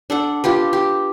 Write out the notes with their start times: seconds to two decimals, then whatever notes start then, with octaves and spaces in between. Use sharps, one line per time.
0.10 D4 A4 F#5
0.44 F4 G4 B4
0.73 G4